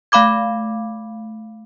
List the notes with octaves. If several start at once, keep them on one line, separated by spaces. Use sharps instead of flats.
A3 F5 B5 D6 G#6